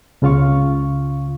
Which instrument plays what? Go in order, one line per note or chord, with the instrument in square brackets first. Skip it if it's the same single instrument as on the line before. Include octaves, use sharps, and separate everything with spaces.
[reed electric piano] C#2 C#3 F4 F5 C#6